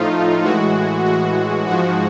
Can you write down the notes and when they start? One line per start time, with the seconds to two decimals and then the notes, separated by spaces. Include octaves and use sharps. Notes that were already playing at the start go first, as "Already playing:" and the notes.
Already playing: A2 F3 A3 D#4 F4
0.43 A2 E3 G#3 F#4
1.05 F#4
1.67 G#2 F3 G#3 F#4